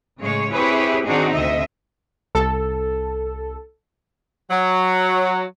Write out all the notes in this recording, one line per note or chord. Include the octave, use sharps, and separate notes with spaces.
A2 C#3 G#3 C#5
C4 E4 G4 G#4 B4 C#5
D#3 C4 D4 D#4 F#4 G#4
D2 C3 C4 D#5 E5
C2 A4
F#3